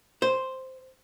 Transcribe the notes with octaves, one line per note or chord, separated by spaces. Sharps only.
C5